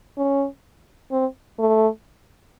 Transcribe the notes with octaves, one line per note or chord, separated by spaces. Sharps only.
C#4
C4
A3